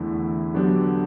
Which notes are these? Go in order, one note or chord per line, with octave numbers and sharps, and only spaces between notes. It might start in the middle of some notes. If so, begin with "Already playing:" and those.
Already playing: E2 D3 A3 E4
D3 F#3 B3 D4 G4